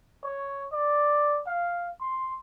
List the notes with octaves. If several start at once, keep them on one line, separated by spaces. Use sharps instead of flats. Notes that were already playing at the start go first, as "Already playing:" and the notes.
C#5
D5
F5
C6